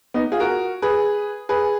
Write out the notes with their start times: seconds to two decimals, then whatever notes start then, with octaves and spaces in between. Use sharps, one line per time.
0.14 B3 D#4
0.32 F4 G#4
0.40 F#4 A#4
0.82 G#4 B4
1.49 G#4 B4